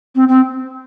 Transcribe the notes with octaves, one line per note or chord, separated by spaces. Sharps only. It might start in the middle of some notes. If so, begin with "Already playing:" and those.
C4
C4